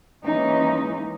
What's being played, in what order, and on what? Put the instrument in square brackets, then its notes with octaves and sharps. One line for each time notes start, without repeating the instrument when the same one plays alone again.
[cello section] E3 G#3 A#3 C#4 D#4